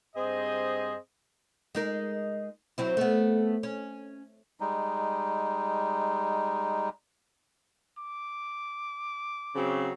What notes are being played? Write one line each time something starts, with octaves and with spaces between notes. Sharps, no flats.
G2 C4 G#4 C5 D#5
G#3 D#4 A#4
F#3 C4 E4
A3 B3
C#4
G3 G#3 D#4
D6
C#3 F#3 C4